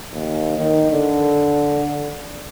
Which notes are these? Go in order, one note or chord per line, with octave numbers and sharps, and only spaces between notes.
D#2
D#3
D3